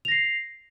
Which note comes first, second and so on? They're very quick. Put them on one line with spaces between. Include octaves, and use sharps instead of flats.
F7 A#6 C7